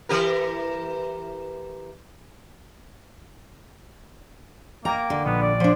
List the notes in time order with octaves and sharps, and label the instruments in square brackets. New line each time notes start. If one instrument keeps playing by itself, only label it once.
[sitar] E3 G4 A#4
[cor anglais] A#3 [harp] D5 G5 G#6 [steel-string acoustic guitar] A#5
[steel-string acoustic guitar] D3
[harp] A#1 [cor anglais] B3
[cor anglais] D5
[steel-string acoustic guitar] F3 D4 [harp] C6